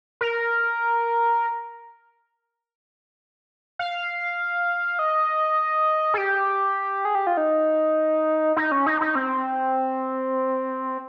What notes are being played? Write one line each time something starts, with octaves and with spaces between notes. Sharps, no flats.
A#4
F5
D#5
G#4
G4
G#4
G4
F4
D#4
D#4
C#4
D#4
D#4
C4